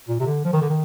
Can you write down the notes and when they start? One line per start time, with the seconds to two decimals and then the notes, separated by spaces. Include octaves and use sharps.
0.09 A#2
0.20 C3
0.26 D3
0.45 F3
0.53 D#3
0.62 D3
0.70 D#3